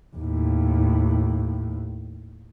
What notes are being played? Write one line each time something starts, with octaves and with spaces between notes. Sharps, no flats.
D#2 A2